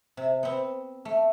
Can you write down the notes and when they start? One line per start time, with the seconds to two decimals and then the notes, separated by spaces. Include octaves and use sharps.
0.17 C3
0.43 B3 C4
1.05 A3